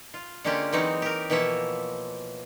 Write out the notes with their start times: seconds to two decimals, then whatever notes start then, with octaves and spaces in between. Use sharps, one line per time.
0.14 F4
0.44 D3 G#3 A#3 C#4 F4 G4
0.72 E3 F#3 G#3 C4 D#4 C#5
1.02 G4 A#4
1.30 B2 E3 F3 A#3 C#5 E5